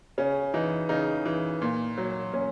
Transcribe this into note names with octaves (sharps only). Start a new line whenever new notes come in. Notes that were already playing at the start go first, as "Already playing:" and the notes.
C#3 C#4
E3 D#4
C#3 D#4
E3
A#2
F#3
A#2 C#4